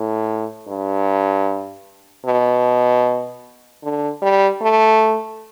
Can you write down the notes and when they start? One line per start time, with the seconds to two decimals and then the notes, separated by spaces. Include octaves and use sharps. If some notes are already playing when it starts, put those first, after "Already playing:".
Already playing: A2
0.69 G2
2.26 B2
3.83 D3
4.22 G3
4.61 A3